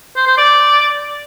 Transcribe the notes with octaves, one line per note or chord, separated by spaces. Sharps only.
C5
C5
D5